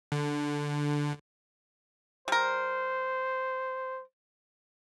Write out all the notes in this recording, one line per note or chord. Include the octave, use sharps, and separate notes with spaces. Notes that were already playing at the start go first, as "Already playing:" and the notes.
D3
G3 A#4 C5